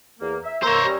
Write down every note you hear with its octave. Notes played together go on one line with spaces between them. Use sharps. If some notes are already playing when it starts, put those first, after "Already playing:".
E2 A#3
E5
A#3 C5 C#5 A#5 E6
G3 C#4